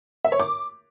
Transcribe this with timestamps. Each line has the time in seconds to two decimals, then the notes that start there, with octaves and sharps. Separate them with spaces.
0.25 E5
0.32 C#5
0.40 D6